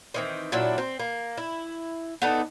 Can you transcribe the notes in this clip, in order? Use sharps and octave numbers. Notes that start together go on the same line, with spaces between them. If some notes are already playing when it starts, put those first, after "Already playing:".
D#3 E3 C4
A#2 F#3 D4 E4
C4
A#3
E4
B3 D4 D#4 A4